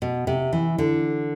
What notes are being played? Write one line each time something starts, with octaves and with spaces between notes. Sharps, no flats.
B2
C3
E3
D3